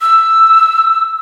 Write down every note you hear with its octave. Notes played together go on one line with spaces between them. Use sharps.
E6